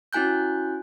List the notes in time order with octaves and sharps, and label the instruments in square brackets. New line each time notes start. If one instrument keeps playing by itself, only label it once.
[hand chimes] C#4 E4 F#4 G#5 F#6 G6